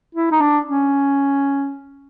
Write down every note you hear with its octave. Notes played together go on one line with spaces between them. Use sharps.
E4
D#4
D4
C#4